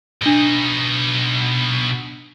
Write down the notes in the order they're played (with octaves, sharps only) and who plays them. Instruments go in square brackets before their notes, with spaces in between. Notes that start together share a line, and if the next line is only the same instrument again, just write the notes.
[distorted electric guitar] B2 D#4 [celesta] D4 G7